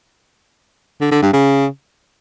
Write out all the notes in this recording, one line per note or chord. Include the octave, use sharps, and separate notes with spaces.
D3
D3
G2
C#3